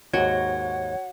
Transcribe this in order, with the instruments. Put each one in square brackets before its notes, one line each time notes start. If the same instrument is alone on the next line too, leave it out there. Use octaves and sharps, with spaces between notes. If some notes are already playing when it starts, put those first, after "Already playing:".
[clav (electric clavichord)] D#2 G#2 [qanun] F#4 [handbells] C#5 [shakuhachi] F#5